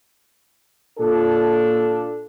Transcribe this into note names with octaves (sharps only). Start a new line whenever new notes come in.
A#2 D4 F4 A4